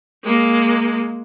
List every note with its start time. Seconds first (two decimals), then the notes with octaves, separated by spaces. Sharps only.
0.23 G#3 A#3